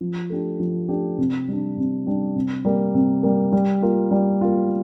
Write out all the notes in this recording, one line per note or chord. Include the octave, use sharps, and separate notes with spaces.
F3
A3 D4 G4
F3
A3 D4 G4
C3
G3 D4
C3
G3 D4
C3
G3 A#3
C3
G3 A#3
G3
A#3 F4
G3
A#3 F4